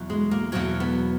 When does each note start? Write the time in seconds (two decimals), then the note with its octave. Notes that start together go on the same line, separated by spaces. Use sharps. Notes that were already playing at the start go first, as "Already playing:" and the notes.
Already playing: E2 B2 F#3
0.10 G#3
0.31 A#3
0.52 E2 B2 F#3 A#3
0.80 B3